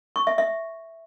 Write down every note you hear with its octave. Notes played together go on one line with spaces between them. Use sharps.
C#6
E5
E5